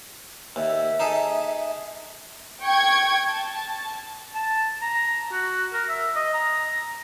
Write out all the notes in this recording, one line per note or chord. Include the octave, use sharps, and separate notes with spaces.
D#2 E5
D#4 G#4 A4
G5 C#6 G#6
A5
A5
A#5
F#4
A#4
E5
D#5
A#5